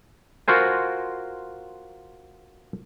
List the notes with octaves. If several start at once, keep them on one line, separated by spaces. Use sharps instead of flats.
F4 F#4 A#4 C5 G#5